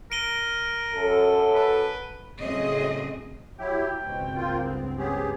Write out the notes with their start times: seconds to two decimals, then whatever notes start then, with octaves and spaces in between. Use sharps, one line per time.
0.12 A#4 D7 D#7 G7
0.94 F#2 A4
1.55 B4
2.39 A2 C#3 F#3 C4 G#4 D#5
3.59 F#3 E4 G4 G5
4.04 C#2 G2 B2 C4
4.36 A#3 F4
4.65 B3
4.98 B3 C#4 G4 G#4